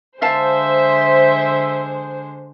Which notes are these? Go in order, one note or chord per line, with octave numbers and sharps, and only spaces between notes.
D3 G#3 C5 E5 F5 A5